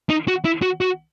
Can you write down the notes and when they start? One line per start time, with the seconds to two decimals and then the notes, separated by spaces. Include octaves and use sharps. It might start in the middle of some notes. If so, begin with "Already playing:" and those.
0.10 D#4
0.28 F#4
0.45 E4
0.62 F#4
0.81 F#4